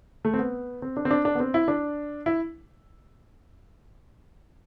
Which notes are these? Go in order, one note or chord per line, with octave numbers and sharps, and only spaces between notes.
A3
C4
B3
C4
D4
C4
D4
D4
B3
C4
E4
D4
E4